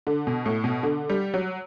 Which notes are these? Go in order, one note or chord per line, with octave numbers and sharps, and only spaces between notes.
D3
B2
A2
B2
D3
G3
F#3